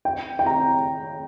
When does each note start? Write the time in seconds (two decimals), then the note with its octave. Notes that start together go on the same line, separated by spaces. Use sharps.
0.05 G5
0.39 G5
0.46 A#5